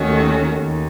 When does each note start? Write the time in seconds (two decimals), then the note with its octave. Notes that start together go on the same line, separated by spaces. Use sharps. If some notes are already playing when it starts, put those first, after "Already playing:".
Already playing: D#2 D#3 A3 C#4 F#4
0.59 D#2